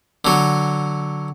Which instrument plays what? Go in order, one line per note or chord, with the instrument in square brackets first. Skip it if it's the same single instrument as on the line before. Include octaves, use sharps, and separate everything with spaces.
[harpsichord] D3 F#3